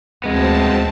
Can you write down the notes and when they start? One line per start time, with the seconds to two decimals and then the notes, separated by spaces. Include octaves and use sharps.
0.24 D2 G#3 B3 C4 A5